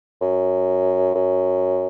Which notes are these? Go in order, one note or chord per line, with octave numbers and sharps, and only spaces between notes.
F#2
F#2